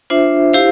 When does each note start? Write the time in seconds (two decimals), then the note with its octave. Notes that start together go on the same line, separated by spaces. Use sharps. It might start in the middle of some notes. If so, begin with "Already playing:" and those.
0.10 D4 F4 C5 E5
0.53 E4 G4 C5 F5